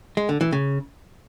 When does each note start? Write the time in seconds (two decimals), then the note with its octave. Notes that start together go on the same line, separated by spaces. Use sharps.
0.17 G#3
0.29 D3
0.41 E3
0.52 C#3